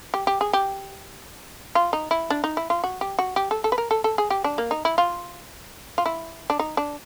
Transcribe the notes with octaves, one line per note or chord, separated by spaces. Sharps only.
G4
G4
G#4
G4
F4
D#4
E4
D4
D#4
E4
F4
F#4
G4
F#4
G4
A4
A4
B4
A#4
A4
A4
G#4
G4
D4
A#3
D#4
E4
F4
F4
E4
D4
D#4
D4